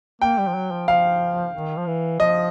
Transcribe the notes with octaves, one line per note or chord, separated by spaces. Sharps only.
A#3 G5
G3
F3
F#3
F3
F3 F5
D#3
F3
E3
F3 D#5